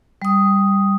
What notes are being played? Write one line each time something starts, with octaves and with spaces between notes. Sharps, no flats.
G3 D#6